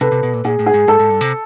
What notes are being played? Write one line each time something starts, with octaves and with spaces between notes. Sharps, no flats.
C3 A4 B4
C3
B2
A#2
A#2 G#4
A2
G#4
G#2
G#2 A4
G#2
G2
C3